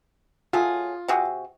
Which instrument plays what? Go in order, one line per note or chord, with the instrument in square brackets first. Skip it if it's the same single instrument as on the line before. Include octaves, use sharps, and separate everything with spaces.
[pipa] F#3 A3 G#4 [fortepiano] F4
[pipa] C3 F#4 G#4